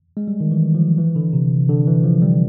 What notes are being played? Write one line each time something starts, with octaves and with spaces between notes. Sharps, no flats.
G#3
G3
D#3
E3
F3
E3
D3
C3
D3
E3
F3
G3